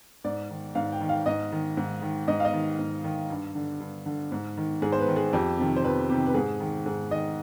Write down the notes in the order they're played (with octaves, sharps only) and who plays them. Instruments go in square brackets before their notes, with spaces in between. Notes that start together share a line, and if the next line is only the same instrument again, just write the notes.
[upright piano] G#2 D5
D#3
G#2 F5
G5
D#3
F5
G#2 D#5
D#3
G#2
D#3
G#2 D#5
F5
D#5
D#3
G#2
D#3
G2
D3
G2
D3
G#2
D#3
G#2 G#4
C5
B4
D#3
G#4
F2 G4
C3 D#3
C5
F2 B4
C3 D#3 G4
B4
G#2 G#4
D#3
G#2 G#4
D#3 D#5